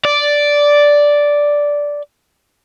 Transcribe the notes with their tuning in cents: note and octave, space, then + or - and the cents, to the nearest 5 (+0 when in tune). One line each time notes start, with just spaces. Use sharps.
D5 -5